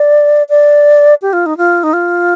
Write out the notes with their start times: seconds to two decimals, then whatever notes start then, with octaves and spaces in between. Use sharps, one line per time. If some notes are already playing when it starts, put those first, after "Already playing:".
Already playing: D5
0.50 D5
1.22 G4
1.33 F4
1.46 D#4
1.58 F4
1.83 D#4
1.93 F4